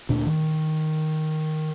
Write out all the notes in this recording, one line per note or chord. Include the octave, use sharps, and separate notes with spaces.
D2 A#2 D4
D#3